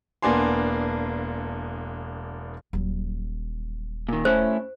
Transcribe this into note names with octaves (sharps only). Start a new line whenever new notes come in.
E1 A#3 B3 D4 G#5 C6
D#1 F#3
A#2 D#3
A3 C#4 E4 C5